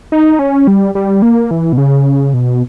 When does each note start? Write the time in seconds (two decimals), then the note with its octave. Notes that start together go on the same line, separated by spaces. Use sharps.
0.12 D#4
0.39 C#4
0.67 G3
0.95 G3
1.22 A#3
1.51 E3
1.73 B2
1.78 C#3
2.34 B2